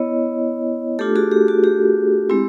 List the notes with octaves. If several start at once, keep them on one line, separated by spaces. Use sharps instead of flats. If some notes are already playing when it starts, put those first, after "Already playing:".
Already playing: B3 E4 C#5 D#5
A3 D4 F4 G4 A4
F#4 G#4
G4
F#4
G4
G#3 C4 E4